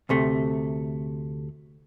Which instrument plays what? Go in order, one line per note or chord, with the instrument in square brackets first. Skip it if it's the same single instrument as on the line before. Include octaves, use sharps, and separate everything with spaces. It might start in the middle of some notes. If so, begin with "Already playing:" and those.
[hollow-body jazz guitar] D2 C3 A3